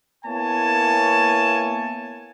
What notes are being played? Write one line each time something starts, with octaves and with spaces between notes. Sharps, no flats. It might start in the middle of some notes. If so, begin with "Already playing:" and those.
A#3 B3 E4 C#5 G#5 A5